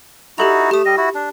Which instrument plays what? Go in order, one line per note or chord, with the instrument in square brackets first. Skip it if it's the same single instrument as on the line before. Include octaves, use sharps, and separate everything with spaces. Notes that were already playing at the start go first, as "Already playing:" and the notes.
[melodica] D#4 E4 F#4 [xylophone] G4 A4 F7
[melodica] A3 [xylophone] G4 D#6
[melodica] G3 D#5
E4 F#4
D4